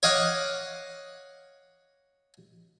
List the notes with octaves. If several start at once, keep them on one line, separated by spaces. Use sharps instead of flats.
C#5 D#5 F5 F#5 D6